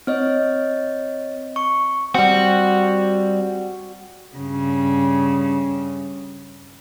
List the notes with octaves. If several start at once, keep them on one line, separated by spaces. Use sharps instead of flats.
C4 C#5 D#5
C#6
G3 C4 F#4
G2 C#3